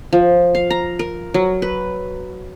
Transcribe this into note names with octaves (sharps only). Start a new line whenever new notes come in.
F3
F5
A#5
A#4
F#3
B4